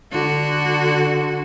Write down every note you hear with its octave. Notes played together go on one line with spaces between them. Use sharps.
D3 F#4